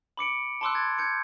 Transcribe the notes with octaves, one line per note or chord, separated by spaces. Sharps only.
B5 D6 C#7 D7
A5 B5 C6 D6 E6 F#6
G#6 A6
G6 G#6 C#7